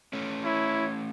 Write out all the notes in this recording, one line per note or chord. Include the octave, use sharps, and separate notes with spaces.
A3 C#4
E4 C#5